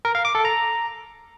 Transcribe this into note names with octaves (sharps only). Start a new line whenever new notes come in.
A#4
F5
D6
A4
A#5